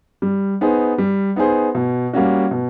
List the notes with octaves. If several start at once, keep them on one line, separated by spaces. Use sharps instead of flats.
G3
B3 D#4 G#4 C5
G3
B3 D#4 G#4 C5
B2
G3 A#3 C#4 F#4
B2